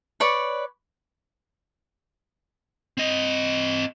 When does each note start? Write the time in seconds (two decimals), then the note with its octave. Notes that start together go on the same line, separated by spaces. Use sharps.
0.20 B4 C#5 D5 C#6
2.98 C4 D#5